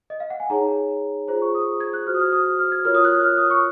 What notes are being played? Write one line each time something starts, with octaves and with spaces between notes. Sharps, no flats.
D#5
F5
F#5
G#5
D#4 G#4 C#5 A#5
F4 G#4 C5 A#5
C#6
D#6
G#6
F#6
F#4 C5 F6
D#6
F6
D#6
D#6
F6
G#6
F4 A#4 C#5 F6
D#6
F#6
F#6
F6
D#6
C#6